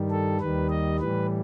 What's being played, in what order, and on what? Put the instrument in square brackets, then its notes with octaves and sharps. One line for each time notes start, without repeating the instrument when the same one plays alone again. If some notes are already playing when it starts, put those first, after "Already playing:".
Already playing: [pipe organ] G2 D#3 G3
A4
D#2 D#3 G3 B4
D#5
A2 E3 G3 B4